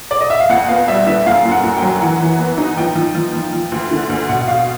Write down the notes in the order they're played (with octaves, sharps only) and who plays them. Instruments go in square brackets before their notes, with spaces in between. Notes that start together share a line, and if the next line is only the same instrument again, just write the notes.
[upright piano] D5
D#5
E5
F5
[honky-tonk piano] F2 [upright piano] F#5
[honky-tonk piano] B3 [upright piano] F5
[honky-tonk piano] G3 [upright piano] E5
[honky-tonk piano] D3 [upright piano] E5
[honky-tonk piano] F#2 [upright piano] F5
[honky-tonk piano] F#2
[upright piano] F#5
[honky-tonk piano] F#2
[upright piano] G5
[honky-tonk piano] F#3
[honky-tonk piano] E3 [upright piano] F#5
[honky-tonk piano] E3
B3
D#4
[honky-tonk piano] F3 [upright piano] G5
[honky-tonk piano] F3
F3
F3
F3
D2
D3
D2
[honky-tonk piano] B2 [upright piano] F#5
[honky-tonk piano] B2 [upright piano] F5